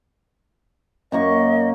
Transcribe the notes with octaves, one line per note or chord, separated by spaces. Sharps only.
F#2 A#3 D#5 C#6